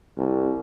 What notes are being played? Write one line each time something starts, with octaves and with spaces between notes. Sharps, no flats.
C2